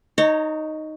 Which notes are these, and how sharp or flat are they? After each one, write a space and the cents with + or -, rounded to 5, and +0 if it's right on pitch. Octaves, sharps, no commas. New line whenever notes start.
D#4 +0 C#5 +0 A#5 -30